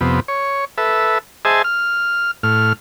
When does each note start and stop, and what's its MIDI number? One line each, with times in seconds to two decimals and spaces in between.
0.01 0.20 41
0.01 0.20 48
0.01 0.20 59
0.28 0.65 73
0.78 1.18 69
0.78 1.18 71
0.78 1.18 76
1.45 1.62 68
1.45 1.62 72
1.45 1.62 75
1.45 1.62 76
1.45 1.62 80
1.45 1.62 81
1.64 2.31 89
2.43 2.73 45
2.43 2.73 89